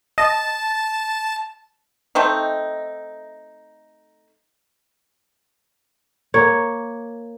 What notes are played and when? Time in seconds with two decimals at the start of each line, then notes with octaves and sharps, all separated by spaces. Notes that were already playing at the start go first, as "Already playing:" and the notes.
0.18 D#5 A5
2.15 A3 C4 D#4
6.34 A#3 C#5